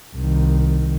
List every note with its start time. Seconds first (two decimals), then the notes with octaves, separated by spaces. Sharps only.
0.15 C2 D#3